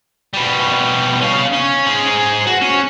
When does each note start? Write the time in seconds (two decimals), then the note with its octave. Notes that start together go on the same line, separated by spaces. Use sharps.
0.33 B2 G3
1.21 C#4 F5
1.53 C#4
1.86 G#4 C5
2.47 F#4
2.61 C#4